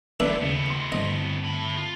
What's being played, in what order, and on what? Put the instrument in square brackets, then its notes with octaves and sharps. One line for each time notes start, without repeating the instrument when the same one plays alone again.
[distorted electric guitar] F#2 D3 [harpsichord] D4 B4 E5
[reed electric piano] D#2 C#3 [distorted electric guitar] A2 B3
[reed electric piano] C6
[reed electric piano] G2 D3 C4 [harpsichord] D#5
[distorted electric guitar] A2 B5
F4